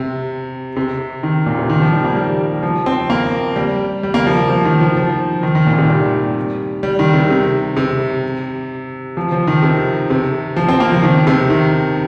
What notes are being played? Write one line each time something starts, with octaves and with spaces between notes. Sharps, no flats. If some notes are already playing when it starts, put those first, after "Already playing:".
Already playing: C3
C3
D#3
A#2
C3
D#3
F3
G3
A#3
G3
F3
C4
A#3
G3
G3
A#3
F3
F3
D#3
F3
F3
D#3
D#3
A#2
D#3
C3
G3
G3
D#3
C3
C3
C3
F3
F3
D#3
C3
C3
F3
C4
A#3
F3
D#3
C3
D#3